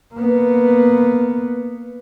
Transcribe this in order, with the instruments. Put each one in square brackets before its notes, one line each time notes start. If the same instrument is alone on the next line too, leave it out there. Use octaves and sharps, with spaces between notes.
[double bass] A#3 B3